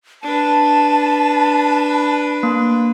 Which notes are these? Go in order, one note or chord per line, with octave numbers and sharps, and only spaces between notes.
D4 B4 A5
A#3